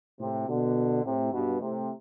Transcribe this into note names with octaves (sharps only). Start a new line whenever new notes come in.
A2 C3
B2 D3
A2 C3
G2 B2
A2 C3